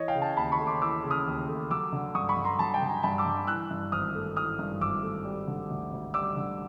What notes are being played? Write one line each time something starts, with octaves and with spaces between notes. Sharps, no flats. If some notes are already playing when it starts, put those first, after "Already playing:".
Already playing: E3 C#5 D#5
F5 G5
C#3
G5 A5
D#2 A5 B5
B5 C#6
A3
C6 D6
E3 D6 E6
C#3
D#6 F6
D#2
A3
F#3 D6 E6
D3
G2 C#6 D#6
B5 C#6
G2
A#5 C6
F#3 A5 B5
G5 A5
D3
G#5 A#5
G2 A5 B5
D6 E6
G2
E3 E6 F#6
G2
G#1 D#6 F6
A3
E3 D#6 F6
G2
G#1 D6 E6
A3
G3
D3
D2
D2
G3 D6 E6
D3